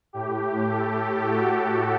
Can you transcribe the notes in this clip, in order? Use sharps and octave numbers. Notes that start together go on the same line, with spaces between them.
A2 G4
A4
F#4